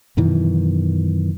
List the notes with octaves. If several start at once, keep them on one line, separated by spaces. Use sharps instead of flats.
F#2 B2 D#3 E3